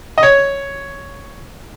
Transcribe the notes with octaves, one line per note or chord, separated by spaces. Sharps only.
D#5
C#5